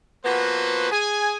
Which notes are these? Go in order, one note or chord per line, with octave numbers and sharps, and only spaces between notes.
F3 A#3 B3 F#4 B4 C5
G#4 G#5